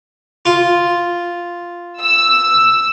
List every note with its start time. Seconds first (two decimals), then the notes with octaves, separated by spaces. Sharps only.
0.46 F4
2.00 E6